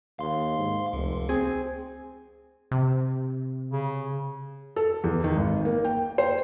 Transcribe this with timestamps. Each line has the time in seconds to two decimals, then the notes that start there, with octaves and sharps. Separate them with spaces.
0.19 D#2 F5 C6
0.59 G#2
0.93 F1 C#2
1.29 C4 G#4
2.71 C3
3.71 C#3
4.76 A4
5.04 E2
5.24 D#3
5.36 G#1
5.65 A#3
5.84 G5
6.18 C5